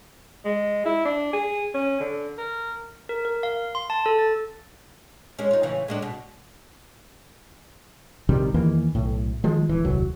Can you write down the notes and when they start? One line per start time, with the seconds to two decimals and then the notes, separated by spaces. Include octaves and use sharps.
0.45 G#3
0.86 E4
1.05 D4
1.33 G#4
1.74 C#4
2.00 D3
2.38 A#4
3.09 A#4
3.25 A#4
3.43 F5
3.75 C6
3.90 A5
4.06 A4
4.19 A6
5.39 G#3 C#4
5.51 D#4 F4
5.63 A2 C#3 E3
5.88 A2 G#3 D4
6.02 B2
8.29 A#1 C3 D#3 G3
8.54 E2 D#3 E3 A#3
8.95 B1 A2
9.44 D#3 F3 G#3
9.69 D1 E3
9.84 D#1 C2 F#3